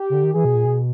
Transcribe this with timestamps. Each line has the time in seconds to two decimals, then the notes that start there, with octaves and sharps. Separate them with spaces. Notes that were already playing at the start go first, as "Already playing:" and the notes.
Already playing: G4
0.10 C#3
0.14 D3
0.24 D#3
0.34 E3 G#4
0.45 B2
0.55 A#2
0.65 B2